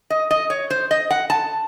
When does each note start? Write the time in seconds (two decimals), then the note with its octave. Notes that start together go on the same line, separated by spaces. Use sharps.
0.10 D#5
0.31 D#5
0.50 C#5
0.70 C5
0.91 D#5
1.11 F#5
1.30 A5